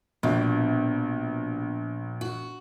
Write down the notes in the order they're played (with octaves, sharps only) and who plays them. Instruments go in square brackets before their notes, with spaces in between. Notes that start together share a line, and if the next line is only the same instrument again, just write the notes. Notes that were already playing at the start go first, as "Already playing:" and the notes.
[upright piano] A#1 [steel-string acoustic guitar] B2
[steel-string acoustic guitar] F#4